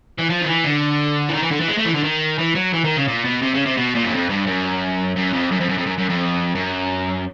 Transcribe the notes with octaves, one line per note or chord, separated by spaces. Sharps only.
E3
F3
D#3
E3
D3
E3
D#3
E3
D3
E3
G#3
A3
E3
D3
D#3
E3
F#3
E3
D#3
C#3
A#2
B2
C3
C#3
C3
B2
A#2
F#2
F2
G2
F#2
F#2
F2
F#2
F2
F#2
F2
F#2
F#2
F2
F#2